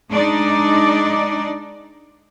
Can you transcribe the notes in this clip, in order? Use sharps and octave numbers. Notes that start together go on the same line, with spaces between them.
G#3 D4 D#4 D5